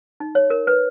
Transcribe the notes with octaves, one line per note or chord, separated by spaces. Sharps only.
D#4
C#5
A#4
B4